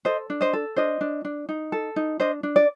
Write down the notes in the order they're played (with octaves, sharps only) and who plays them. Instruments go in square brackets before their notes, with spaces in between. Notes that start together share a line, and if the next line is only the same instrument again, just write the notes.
[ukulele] A4 C5 D#5
D4
C5 D#5
A4
D4 C5 D#5
D4
D4
D#4
A4
D#4
D4 C5 D#5
D4
D5